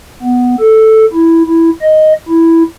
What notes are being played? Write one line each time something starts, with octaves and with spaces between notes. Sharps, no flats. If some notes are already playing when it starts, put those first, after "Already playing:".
B3
A4
E4
E4
D#5
E4